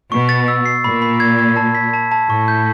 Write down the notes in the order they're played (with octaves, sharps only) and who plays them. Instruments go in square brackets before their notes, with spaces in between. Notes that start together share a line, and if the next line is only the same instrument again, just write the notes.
[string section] B2 [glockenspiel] C#6
[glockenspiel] A6
E6
C7
[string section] A#2 [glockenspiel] B5
[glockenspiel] B5
G#6
G#6
A5
B6
A5
A5
[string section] A2 [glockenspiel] C#6
[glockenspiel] G6